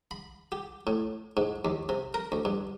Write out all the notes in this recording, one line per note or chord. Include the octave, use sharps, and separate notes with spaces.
B5
G4
A2
G#2
D#2
C3
A#4
D2
G2